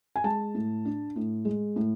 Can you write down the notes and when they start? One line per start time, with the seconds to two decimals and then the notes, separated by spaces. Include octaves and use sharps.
0.16 G#5
0.24 G#3 A5
0.55 A2
0.85 D4
1.16 A2
1.45 G#3
1.76 A2